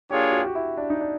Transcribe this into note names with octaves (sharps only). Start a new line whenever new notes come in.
A#3 D4 F4 G4 G#4 C#5
F#4
G4
F#4
E4
D4
D#4
D4